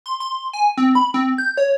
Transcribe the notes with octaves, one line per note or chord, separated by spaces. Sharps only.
C6
C6
G#5
C4
B5
C4
G6
C#5